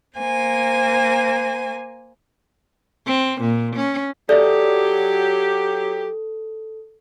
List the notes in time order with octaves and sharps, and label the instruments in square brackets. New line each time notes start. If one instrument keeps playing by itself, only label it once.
[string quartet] A#3 C5 G#5
[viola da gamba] C4
A#2
C#4
[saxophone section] F#3 G4 [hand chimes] A4 [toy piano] D5 E5